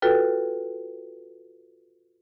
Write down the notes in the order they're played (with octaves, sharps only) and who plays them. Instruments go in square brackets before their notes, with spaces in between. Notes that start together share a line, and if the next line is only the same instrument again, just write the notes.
[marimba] F4 F#4 A4 B4 G5